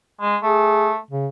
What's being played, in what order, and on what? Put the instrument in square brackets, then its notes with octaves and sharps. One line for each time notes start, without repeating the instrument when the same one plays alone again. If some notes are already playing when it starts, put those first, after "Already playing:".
[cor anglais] G#3
[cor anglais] A3 [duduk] G#4
[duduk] C#3